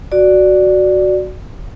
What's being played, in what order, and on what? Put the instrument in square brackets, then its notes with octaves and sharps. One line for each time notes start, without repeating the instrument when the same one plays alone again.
[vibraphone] F#4 D5